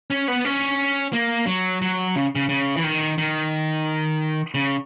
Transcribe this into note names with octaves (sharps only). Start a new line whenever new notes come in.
C#4
B3
C#4
A#3
F#3
F#3
C#3
C#3
C#3
E3
D#3
D#3
C#3